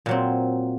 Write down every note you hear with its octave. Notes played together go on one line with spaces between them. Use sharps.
A#2 F#3 C4